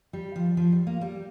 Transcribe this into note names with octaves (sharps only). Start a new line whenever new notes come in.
G3
F3
F3
G3
A#3
G3